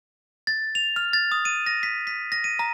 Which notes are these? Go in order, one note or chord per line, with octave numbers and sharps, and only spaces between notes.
A6
F7
F6
A6
D#6
D#7
A#6
B6
B6
A#6
D#7
A#5